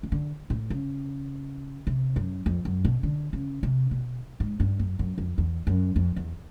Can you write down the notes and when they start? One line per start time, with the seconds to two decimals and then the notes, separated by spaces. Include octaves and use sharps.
0.03 D#3
0.12 D3
0.50 A2
0.70 C#3
1.87 C3
2.16 F#2
2.46 F2
2.65 F#2
2.85 B2
3.03 D3
3.33 C#3
3.63 C3
3.91 B2
4.40 G#2
4.60 G2
4.79 F#2
4.99 F#2
5.18 F2
5.38 E2
5.67 F#2
5.96 F2
6.16 E2